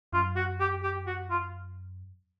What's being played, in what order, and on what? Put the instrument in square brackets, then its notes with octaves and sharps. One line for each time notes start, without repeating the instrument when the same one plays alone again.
[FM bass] F#2 [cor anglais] F4
[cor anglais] F#4
G4
G4
F#4
F4